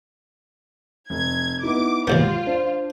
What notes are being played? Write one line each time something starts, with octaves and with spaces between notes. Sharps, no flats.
F1 G#6
B3 D#4 E4 D6
D#2 G#2 B3 F4 G6
D4 C5